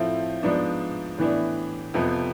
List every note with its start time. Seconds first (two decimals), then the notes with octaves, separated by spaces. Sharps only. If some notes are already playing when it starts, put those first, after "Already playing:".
Already playing: A2 F3 A3 C4 E4
0.43 G#2 F3 B3 D4
1.18 A2 E3 B3 D4
1.94 F2 C3 F3 B3